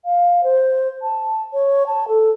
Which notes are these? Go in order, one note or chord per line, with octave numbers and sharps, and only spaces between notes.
F5
C5
A5
C#5
A5
A4